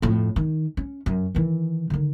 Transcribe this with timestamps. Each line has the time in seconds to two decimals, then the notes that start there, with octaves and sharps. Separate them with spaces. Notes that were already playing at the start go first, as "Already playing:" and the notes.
0.02 F2 A2
0.36 D#3
0.77 C#4
1.06 F#2
1.35 D#3 E3
1.90 D3 D#3